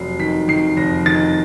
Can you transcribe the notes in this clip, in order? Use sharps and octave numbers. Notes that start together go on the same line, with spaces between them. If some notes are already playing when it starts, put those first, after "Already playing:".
Already playing: F1 F#3 C7
D#3 B6
D#3 C7
F1 A#6
D#3 A6